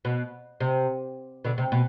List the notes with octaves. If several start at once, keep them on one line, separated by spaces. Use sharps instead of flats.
B2
C3
B2 D3
C3
B2